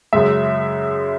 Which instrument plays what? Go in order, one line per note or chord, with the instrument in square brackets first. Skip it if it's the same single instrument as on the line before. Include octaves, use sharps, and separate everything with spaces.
[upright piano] F#2 C#3 G#3 E5